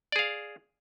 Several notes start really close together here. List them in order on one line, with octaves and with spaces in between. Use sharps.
D5 G#4 F5